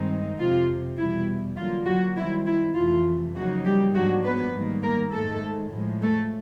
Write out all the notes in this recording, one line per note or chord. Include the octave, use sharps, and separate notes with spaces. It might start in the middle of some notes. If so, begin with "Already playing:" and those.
Already playing: G2 D#3 G#3 C4 D#4
F2 C3 F3 F4
E2 B2 G3 E4
D3 F#3 A#3 F4
F#3 F#4
D#3 G3 C4 E4
E4
F2 C3 E3 A3 F4
C#3 F3 F#3 A#3 D#4 F#4
G3 G4
G#2 F3 F#3 A#3 D4 F#4
B3 B4
G#2 D#3 G3 A#3
A#3 A#4
G#2 D#3 G#3 A3 A4
A2 F3 G#3
A3 A4